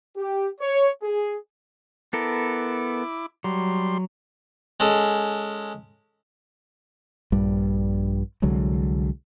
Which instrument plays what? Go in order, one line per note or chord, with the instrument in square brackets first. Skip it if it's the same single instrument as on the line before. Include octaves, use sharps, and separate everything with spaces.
[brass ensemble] G4
C#5
G#4
[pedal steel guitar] B3 A4 A#4 [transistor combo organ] E4 D6
[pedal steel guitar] F#3 [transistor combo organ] G3 C6
[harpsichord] G#3 C#4 A4
[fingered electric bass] A#1 G2 G3
C2 D3 F#3 G#3